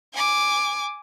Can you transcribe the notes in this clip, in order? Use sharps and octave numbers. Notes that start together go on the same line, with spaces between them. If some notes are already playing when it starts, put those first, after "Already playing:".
G#5 D6